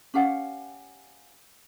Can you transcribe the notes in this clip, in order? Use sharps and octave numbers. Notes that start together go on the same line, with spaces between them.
C#4 G4 F5 F#5